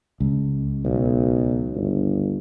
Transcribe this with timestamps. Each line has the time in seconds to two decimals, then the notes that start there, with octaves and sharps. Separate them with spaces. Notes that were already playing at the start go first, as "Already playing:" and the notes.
0.20 C#2
0.85 B1
1.75 G1